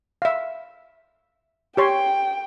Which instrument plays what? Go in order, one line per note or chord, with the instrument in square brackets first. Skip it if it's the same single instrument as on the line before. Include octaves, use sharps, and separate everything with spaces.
[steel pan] E5 F5
[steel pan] G4 C#5 C6 [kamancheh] G5